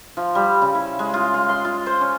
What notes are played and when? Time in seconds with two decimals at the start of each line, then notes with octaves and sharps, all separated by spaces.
0.17 F3
0.35 G3
0.62 C#3
0.75 E4
0.99 G#3
1.14 F4
1.34 F4
1.49 C6
1.65 F4
1.86 C5
2.01 C#4